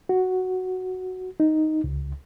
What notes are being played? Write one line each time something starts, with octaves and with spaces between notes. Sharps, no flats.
F#4
D#4
C#2